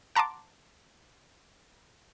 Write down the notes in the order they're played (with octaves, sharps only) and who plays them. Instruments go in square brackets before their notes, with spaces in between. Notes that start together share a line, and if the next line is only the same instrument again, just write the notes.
[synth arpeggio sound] F#5 A5 A#5 C6 D6